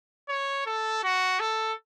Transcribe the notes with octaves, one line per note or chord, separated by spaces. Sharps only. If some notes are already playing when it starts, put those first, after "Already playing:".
C#5
A4
F#4
A4